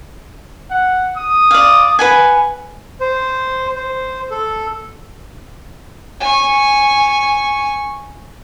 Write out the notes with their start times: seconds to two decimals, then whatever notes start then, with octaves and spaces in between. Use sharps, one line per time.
0.71 F#5
1.17 D#6
1.51 D5 F5
1.99 B4 F#5 G#5
3.01 C5
3.75 C5
4.31 A4
6.20 G#5 C#6